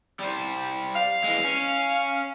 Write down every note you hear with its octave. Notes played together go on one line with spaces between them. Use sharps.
G3 C5
F5
E3 G#3
C#4